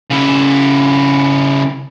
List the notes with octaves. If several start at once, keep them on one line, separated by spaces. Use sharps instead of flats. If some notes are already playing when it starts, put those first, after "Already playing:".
C#3 E4